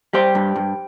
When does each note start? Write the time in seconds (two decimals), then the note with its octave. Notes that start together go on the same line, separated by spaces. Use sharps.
0.13 G3 G4 C5
0.35 G2
0.56 G2